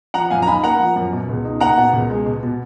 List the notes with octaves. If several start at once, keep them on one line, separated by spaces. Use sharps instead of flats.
F3 F#5 A#5
F#2 F5 G#5
A#5
D#4 G#5 B5
A#3 F#5 A#5
F3
F#2
B2
C#2
D#4
A#3 F#5 A#5
B2
C#2
G#3
B2
B2